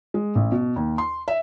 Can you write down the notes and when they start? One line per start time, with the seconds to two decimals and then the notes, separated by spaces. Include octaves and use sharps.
0.14 G#3
0.35 A1
0.52 B2
0.76 D#2
0.98 C6
1.28 E5